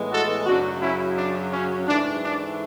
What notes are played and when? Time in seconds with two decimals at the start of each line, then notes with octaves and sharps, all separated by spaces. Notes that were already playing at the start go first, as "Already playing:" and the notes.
Already playing: A2 E3 G#3 B3
0.11 F#4 A4
0.46 F#2 C#3 F#3 D4 F#4
0.82 C#4 E4
1.18 D4
1.52 C#4
1.88 G#2 E3 A3 D4
2.23 D4